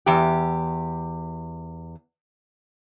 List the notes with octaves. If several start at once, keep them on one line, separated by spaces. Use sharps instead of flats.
E2 G4